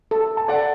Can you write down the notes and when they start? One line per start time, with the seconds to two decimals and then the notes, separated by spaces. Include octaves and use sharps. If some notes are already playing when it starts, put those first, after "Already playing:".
0.11 A4
0.37 A5
0.48 A4 D5 F#5